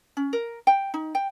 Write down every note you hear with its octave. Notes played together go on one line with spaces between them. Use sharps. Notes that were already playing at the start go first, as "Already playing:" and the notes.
C#4
A#4
G5
D#4
G5